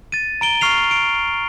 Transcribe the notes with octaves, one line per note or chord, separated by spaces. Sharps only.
A6 D#7
A#5 D7 G7
C#6 F6 C7 F7
D7